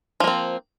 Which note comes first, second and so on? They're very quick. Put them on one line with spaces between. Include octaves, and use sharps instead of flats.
F3 A#3 C4